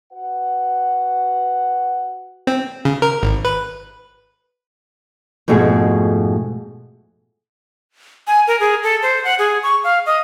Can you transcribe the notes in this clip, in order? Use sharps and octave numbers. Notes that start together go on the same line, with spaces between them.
F#4 B4 F#5
C4
C#3
A#4
G#1
B4
F2 G#2 B2 A3 F#4 G#4
G#5
A#4
G#4
A4
C5
F#5
G#4
C#6
F5
D#5